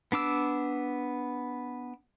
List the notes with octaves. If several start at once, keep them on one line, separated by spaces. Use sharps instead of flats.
B3 D4 D6 E6